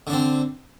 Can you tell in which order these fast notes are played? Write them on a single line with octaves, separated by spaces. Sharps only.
D3 D4 C4